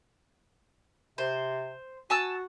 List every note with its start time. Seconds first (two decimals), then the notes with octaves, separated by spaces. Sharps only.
1.18 C3 C5
2.10 F#4 G#5 A5 E6